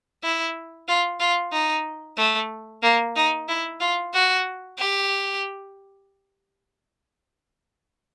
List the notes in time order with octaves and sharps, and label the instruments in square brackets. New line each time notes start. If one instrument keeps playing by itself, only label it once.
[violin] E4
F4
F4
D#4
A3
A#3
D#4
E4
F4
F#4
G4